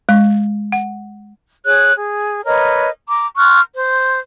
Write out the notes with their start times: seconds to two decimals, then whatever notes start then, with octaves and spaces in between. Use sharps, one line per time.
0.09 G#3
0.72 F#5
1.65 G#4 C#5 F#6
1.96 G#4
2.45 A#4 B4 C#5 D#5
3.08 A#5 D6
3.37 C6 C#6 F6 F#6
3.74 C5